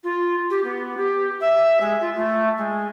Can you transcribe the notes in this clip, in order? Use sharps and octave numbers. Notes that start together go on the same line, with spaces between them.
F4
G4
B3
G4
E5
G#3
F4
A3
G#3